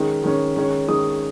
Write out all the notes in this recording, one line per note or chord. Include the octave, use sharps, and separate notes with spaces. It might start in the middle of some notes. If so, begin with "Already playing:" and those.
Already playing: D#3 G#3 C#4
D#3 G#3 C#4
D#3 G#3 C#4
D#3 G#3 C#4 D#6